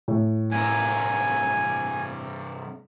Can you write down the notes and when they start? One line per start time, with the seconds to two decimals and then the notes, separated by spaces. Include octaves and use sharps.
0.08 A2
0.51 G2 C3 A#4 G#5